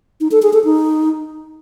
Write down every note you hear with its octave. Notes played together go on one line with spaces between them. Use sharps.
D#4
A4
G#4
A4
D#4